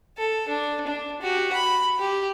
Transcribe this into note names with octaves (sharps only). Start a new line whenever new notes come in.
A4
D4
D4
F#4 G4
B5
G4